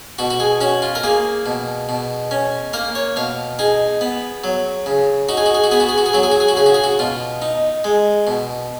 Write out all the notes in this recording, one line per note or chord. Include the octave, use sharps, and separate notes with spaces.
B2 F#4
F#4
G#4
C#4 F#4
F4
A#4
A#3 G#4
B2
B2
C#4
A#3 A#4
C#5
B2 F5
D#4 G#4
B3
F#3
C#3
D#4 F#4
G#4
F#4
G#4
F#4
B3 G#4
F#4
G#4
F#4
G#4
F#3 F#4
G#4
F#4
G#4
F#4
C#3 G#4
F#4
G#4
F#4
B2 F4
D#4
G#3
B2